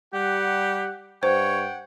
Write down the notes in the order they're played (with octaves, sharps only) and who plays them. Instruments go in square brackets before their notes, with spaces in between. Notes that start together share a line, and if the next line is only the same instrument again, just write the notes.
[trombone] G3 [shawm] G4 [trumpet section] F#5
[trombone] G2 [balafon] C5 [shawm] C#5 [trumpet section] F#5 G5